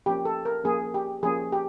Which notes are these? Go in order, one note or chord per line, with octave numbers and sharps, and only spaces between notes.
F3 A#3 C#4 G4
A4
A#4
F3 A#3 C#4 G#4
G4
F3 A#3 C#4 G#4
G4